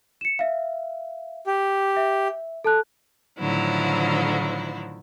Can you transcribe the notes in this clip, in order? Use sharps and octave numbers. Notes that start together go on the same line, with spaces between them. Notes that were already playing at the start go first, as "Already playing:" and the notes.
C#7 E7
E5 F5
G4
E5
A4 A5 F#6
A2 D3 D#3 F3 F#3 E4